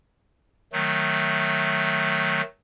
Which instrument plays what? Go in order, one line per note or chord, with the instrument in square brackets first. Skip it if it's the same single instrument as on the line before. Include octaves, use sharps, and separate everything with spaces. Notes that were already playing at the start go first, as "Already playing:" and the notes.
[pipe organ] D#3 F#3 A3